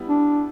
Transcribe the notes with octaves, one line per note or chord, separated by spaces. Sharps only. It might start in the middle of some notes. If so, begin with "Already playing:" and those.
Already playing: G3 B3 E4
D4